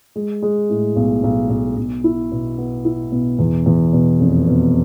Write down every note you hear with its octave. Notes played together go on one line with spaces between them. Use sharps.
G#3
G#3
A2
B1
B1
B1
B1
E4
B2
B3
E4
B2
E2
E2
B2
F1
B2